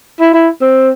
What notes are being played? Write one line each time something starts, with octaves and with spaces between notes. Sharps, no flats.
E4
E4
C4